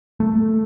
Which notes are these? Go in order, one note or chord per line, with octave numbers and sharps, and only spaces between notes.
A3